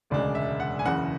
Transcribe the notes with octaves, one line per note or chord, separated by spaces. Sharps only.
E1 D2 C#3 G#3 D4 D5
E5
F#5
G#5
F#1 E2 C#3 F#5